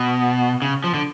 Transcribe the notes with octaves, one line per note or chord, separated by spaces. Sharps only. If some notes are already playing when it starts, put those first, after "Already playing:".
Already playing: B2
C#3
F3
D3